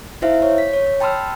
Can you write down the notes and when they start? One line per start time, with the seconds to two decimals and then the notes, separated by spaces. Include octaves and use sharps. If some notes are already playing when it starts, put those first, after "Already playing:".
0.22 D#4 E4 C5 E5 F5
0.42 C#5
0.58 B6
0.73 C#5
1.00 G5 A5 B5 C6 E6 F6